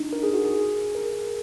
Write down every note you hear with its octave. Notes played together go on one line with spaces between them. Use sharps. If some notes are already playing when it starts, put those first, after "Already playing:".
Already playing: D4 D#4
A#4
G#4
F#4
G#4
A#4